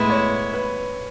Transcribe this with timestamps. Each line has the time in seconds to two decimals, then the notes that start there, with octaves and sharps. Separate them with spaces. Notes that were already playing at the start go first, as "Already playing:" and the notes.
Already playing: A2 G#3 B3 E4 B4
0.10 C#5
0.53 B4